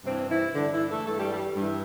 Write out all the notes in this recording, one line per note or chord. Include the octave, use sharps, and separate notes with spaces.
G2 C3 E3 C4
E3 E4
G2 D3 E3 D4
E3 E4
A3 A4
G2 E3 A3 A4
G3 G4
G3 G4
G2 E3